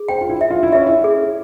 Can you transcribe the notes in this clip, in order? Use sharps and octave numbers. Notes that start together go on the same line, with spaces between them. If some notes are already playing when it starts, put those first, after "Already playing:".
Already playing: G#4
C5 G5
F4
E4
E5
F4
E4
C#4 E5
E4
G#4